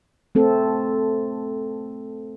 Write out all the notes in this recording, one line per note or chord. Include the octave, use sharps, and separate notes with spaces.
A3 C4 A4